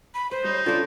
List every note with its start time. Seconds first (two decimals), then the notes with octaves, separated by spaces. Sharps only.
0.14 B5
0.31 B4 C5
0.44 G3 D#4 C#5
0.66 C#3 D4 F4 A4 C5 D5